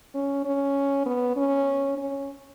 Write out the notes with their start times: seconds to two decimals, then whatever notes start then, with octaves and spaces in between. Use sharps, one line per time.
0.14 C#4
0.45 C#4
1.06 B3
1.37 C#4
1.97 C#4